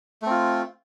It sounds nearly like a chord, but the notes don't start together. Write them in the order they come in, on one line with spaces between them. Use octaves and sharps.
A3 C4 F4